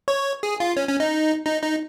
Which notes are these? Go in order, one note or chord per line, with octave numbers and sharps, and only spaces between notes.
C#5
G#4
F4
C#4
C#4
D#4
D#4
D#4